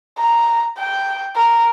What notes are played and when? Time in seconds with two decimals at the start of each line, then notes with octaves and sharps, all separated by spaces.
0.19 A#5
0.78 G5
1.36 A#4